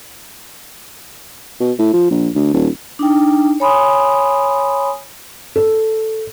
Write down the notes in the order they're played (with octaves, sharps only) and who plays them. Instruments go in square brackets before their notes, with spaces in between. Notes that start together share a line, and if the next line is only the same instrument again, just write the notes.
[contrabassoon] B2
A2
F3
A#1
D2
D#1
[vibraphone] D4 D#4 G5
C#5 G#5 B5 C6 D#6
[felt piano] A4